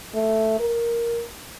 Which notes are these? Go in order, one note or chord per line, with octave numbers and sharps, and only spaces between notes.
A3
A#4